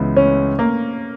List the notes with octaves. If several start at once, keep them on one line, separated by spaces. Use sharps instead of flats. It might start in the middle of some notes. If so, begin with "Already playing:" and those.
Already playing: C#2 C#3 E3 B3
C#4
A#3